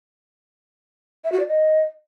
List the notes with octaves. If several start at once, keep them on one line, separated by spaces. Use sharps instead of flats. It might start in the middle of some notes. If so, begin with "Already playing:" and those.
E5
F#4
D5
D#5